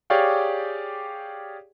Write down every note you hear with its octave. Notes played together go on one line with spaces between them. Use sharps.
G4 G#4 C#5 D5 F5 G5